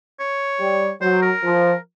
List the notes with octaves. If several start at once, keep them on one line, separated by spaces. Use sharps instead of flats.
C#5
G3
F#3 C5
A#4
F3